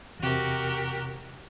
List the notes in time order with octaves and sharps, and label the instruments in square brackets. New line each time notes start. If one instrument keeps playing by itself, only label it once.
[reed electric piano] E2 C3 [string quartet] F#4 G4 A#4